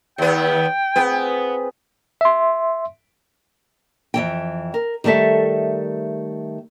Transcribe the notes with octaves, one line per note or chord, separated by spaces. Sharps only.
D#2 B3 G5
B3 C4 G#4 B4
E5 C6
F2 E3 G5
A#4
D#3 G3 A3 A4 E5